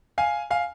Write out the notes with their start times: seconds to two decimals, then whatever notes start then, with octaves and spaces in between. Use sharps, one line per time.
0.18 F5 G#5
0.50 F5 G#5